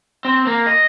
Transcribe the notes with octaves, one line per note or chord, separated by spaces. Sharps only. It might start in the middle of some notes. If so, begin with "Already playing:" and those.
C4
A#3
D#5